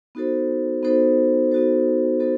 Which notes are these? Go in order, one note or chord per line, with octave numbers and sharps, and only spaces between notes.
B3 D#4 F#4 A4 C5
B3 D#4 F#4 A4 C5
B3 D#4 F#4 A4 C5
B3 D#4 F#4 A4 C5